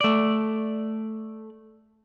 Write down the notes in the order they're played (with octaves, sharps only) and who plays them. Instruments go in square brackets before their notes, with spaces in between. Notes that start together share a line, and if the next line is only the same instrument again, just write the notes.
[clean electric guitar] A3 D5